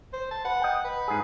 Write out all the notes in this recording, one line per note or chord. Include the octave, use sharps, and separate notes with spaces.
C5
A5
B4 F#5
D#5 G5
B4
G#2 G#4